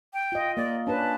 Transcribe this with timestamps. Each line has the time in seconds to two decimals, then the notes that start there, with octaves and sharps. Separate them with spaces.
0.14 G5
0.32 F4 D#5
0.57 A#3 D5
0.87 C#4 D4 B4 A5